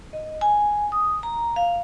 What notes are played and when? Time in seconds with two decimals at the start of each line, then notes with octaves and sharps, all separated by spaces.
0.13 D#5
0.41 G#5
0.92 D#6
1.23 A#5
1.56 F5